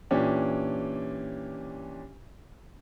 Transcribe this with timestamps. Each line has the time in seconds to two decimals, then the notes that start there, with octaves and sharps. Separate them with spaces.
0.11 A#2 E3 C#4 D4 G4